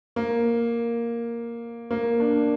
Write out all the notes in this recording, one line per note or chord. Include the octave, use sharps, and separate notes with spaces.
A#3
A#3
D4